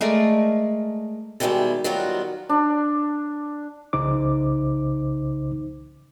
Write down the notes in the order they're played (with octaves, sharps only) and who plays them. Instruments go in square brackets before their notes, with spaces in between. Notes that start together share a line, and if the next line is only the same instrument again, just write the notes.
[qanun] G#3 A3 A#4 D5
[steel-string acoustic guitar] B2 D#3 F3 G3 G#3 E4
D#3 F#3 G3 B3 F4 F#4
[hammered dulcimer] D4
[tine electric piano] C2 C#3 D#4 C5 D6